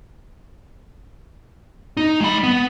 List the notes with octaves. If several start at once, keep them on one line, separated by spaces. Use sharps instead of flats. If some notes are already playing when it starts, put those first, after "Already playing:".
D#4
G#3 B5
B3